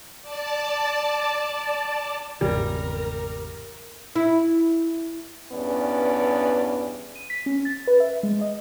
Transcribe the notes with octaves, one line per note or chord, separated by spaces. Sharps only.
D5 A5
G#1 E2 C#3 G3 A#4
E4
E2 G2 B3 C#4 D5
D#7
B6
C#4
A6
B4
E5
G#3
D#5